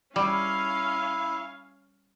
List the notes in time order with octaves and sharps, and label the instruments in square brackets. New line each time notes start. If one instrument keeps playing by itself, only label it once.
[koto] G3 [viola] C#4 F5 [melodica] E4